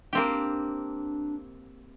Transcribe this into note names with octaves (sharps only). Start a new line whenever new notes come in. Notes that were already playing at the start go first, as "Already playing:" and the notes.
A#3 C4 D4 G4